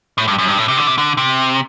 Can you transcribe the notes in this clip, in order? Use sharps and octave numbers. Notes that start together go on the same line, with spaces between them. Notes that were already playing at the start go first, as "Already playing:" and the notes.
A2
G2
F#2
G2
A2
C3
D3
C3
D3
C3